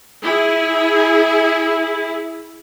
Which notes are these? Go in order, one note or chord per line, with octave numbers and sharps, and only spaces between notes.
E4 G#4